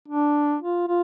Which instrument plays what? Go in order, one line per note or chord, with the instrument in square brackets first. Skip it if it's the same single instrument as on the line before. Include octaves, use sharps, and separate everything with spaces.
[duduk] D4
F4
F4